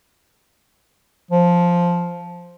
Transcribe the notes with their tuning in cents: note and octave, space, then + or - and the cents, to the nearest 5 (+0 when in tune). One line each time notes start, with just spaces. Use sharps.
F3 +0